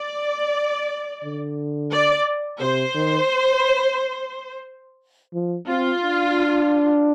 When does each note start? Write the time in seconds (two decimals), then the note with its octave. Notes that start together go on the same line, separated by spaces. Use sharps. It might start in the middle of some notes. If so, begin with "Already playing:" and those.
Already playing: D5
1.24 D3
1.92 D5
2.61 C3 C5
2.95 D#3
5.34 F3
5.68 C4 F4
6.02 D4